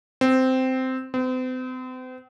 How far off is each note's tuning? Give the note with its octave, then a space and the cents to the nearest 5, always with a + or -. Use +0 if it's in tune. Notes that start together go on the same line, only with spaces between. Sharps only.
C4 -10
C4 -40